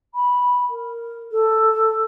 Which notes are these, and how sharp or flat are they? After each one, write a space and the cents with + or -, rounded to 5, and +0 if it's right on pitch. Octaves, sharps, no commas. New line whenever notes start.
B5 -10
A#4 -5
A4 +5